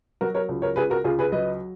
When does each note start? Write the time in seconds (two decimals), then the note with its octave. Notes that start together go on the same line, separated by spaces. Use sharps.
0.21 F#3 F#4 A#4
0.35 A#4 C#5
0.49 C#2
0.62 A#4 C#5
0.76 C#2 G#4 B4
0.90 F#4 A#4
1.04 C#2 F4 G#4
1.19 G#4 B4
1.32 F#3 B4 D#5